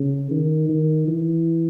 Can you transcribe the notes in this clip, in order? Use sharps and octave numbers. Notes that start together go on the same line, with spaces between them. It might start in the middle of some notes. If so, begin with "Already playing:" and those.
Already playing: C#3
D#3
D#3
E3